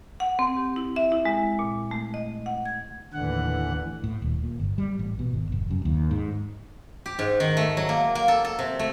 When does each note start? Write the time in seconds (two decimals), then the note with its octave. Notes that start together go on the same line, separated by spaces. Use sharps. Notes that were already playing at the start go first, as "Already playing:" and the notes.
0.20 F#5
0.39 C4
0.57 G4
0.76 E4
0.96 E5
1.12 E4
1.25 G#3
1.59 A#2
1.91 A3
2.14 D#5
2.46 F#5
2.66 G#6
3.13 D#2 A2 D3 E3 F#5
4.04 A2
4.22 D#1
4.43 A#2
4.60 G1
4.78 G3
4.99 A1
5.19 B2
5.34 G#1
5.52 F1
5.70 F#2
5.85 D#2
6.11 G#2
7.06 G4
7.19 G#2
7.40 D#3
7.57 A3
7.77 F#3
7.89 A#3
8.15 A#3
8.28 A4
8.44 A4
8.59 C3
8.79 A3